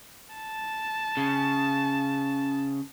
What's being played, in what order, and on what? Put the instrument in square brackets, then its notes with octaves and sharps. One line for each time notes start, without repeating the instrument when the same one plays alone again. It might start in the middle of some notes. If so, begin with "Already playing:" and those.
[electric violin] A5
[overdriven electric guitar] C#3